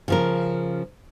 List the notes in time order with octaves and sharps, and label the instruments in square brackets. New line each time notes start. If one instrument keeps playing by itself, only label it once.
[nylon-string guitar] C#3 F3 A#4